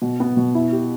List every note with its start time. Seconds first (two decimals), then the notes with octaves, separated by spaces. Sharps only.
0.02 B2
0.20 B3
0.37 B2
0.55 E4
0.72 G4